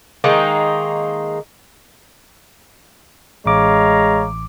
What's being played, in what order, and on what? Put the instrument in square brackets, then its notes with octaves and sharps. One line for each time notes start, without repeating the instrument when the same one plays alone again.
[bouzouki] D#3 G#3 A#3 D#4
[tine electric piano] A1 D6 [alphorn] G#3 [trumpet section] C#5 F5 A#5